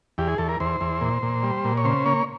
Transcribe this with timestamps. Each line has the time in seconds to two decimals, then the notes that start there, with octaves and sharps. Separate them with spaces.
0.18 E2 G4
0.28 G#4
0.38 E2 A4
0.49 A#4
0.60 E2 C5
0.81 E2
1.01 A#2
1.22 A#2
1.43 G3
1.64 A#2
1.77 C#5
1.85 C#3 C5
2.06 A#3 C#5